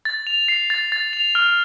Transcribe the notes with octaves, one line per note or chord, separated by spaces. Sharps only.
A6
F7
C7
A6
A6
F7
F6